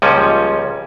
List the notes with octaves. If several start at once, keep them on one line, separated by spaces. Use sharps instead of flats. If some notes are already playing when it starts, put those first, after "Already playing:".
C#2 A#2 F3 G3 C#4